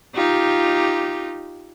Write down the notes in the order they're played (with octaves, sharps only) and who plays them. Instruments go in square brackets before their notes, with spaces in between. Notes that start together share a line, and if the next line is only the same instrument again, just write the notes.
[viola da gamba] D#4 F4 G4